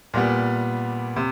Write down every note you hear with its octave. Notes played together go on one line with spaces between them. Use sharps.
A#2 G3 B3
C3